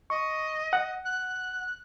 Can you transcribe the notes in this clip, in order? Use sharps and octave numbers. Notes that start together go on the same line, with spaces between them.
D#5 C#6
F#5
F#6